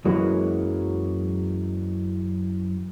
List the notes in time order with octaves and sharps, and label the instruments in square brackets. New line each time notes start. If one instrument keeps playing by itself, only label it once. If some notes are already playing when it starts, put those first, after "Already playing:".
[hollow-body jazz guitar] F#2 E3 F#3 G#3 A#3 F#4